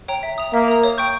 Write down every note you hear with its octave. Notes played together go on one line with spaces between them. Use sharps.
C#5 G5 A#5
E5
A#5 D#6
A#3 E5
A#5 D#6
C#5
G5 C#6 G6